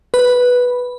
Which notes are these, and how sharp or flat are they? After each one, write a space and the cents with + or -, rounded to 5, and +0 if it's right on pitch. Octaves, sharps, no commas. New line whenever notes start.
B4 -5